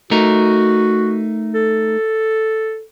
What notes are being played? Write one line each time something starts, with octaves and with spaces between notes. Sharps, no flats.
A3 D#4 F#4 A#4
A4